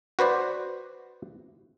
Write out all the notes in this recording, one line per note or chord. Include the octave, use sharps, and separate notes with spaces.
F#4 B4 C5 D5